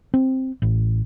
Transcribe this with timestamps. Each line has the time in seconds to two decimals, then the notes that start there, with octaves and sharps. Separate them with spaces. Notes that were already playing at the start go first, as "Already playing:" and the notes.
0.14 C4
0.62 A1